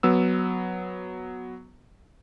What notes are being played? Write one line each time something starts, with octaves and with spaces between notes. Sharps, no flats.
F#3 B3 E6